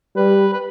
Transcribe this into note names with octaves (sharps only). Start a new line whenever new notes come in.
G3 B4
B4